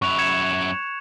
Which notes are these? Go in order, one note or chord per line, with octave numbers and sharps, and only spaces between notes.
F#2 E4 C#6 F#6 F7
G#6 C#7 E7